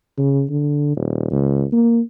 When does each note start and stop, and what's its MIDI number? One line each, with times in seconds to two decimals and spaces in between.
0.18 0.44 49
0.50 0.92 50
0.96 1.31 27
1.32 1.64 37
1.73 2.00 58